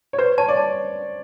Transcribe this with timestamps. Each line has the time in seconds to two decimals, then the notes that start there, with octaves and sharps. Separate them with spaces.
0.13 C#5
0.18 B4 C5
0.38 C#5 A5
0.48 D5
0.57 C#5 A5